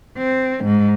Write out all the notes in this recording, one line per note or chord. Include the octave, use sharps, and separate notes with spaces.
C4
G#2